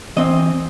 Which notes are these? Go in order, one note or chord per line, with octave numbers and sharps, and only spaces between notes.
E3 C4 D#5